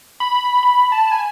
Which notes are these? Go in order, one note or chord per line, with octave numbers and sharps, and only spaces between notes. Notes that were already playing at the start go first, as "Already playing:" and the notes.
B5
B5
A5
G#5